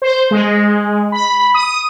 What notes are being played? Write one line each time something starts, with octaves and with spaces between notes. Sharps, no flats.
C5
G#3
B5
D#6